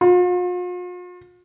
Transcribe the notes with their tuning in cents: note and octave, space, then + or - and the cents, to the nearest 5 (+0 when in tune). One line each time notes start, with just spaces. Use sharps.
F4 +45